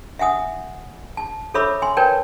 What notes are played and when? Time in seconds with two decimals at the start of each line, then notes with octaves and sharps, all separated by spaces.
0.19 E5 F#5 G#5 D#6
1.17 A5
1.54 A4 C#5 E5 B5 D6 E6
1.82 G#5 C6
1.97 A#4 B4 C#5 D5 G5 A5